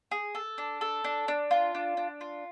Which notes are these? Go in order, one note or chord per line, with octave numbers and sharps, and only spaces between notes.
G#4
A4
D4
A4
D4
D4
F4
D4
D4
F4